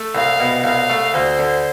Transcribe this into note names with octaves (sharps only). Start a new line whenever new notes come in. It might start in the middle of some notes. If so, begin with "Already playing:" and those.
Already playing: A3
C2 F5
B2
C2 F5
A3
D2 C5
D3